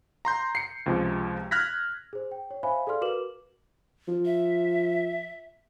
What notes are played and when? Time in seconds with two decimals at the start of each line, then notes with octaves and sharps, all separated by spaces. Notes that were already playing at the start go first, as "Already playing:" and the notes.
0.25 A#5 C6 G6
0.55 C7 C#7
0.86 C#2 C3 F3 G#3
1.51 F6 F#6 G#6 A#6 B6
2.13 G#4 C5
2.31 G5
2.51 C#5
2.63 C5 E5 F5 G#5 B5
2.87 G#4 A4 D5 F5 C6 F6
3.01 F#4 A#4 B4 D6 E7 F#7
4.08 F3
4.25 E5